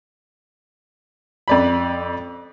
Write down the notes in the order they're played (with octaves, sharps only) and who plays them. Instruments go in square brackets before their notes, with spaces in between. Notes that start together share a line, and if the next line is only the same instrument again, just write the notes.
[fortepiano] F2 D5 B5